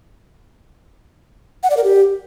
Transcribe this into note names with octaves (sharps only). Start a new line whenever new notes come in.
F#5
D5
A#4
G4